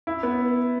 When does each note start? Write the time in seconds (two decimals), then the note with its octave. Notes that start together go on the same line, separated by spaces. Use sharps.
0.07 E4
0.23 B3